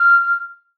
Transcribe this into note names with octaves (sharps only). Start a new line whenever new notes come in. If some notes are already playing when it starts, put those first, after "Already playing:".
Already playing: F6